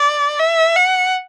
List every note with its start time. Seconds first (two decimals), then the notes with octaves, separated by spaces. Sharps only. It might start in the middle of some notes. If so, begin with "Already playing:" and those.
Already playing: D5
0.40 E5
0.76 F#5